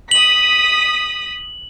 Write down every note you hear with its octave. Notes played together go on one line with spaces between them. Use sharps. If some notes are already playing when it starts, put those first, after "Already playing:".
D#6 B6 F#7